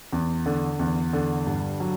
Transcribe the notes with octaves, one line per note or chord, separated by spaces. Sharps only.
E2
D3
E2
D3
G2
F#3